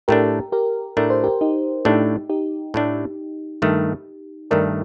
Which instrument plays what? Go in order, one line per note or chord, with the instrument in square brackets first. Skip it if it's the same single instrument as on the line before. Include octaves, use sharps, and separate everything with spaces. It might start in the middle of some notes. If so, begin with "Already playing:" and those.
[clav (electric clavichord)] A2 A3 D4 [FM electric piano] G4 A#4
[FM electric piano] G4 A#4
[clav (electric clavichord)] A2 A3 D4 [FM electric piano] A#4
[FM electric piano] C5
G4 A#4
D#4 G4
[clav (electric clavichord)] A2 A3 D4 [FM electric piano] D#4 G4
[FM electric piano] D#4 G4
[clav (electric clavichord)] A2 A3 D4
G2 D#3 A3
[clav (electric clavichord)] G2 D#3 A3 [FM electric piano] A#4 D5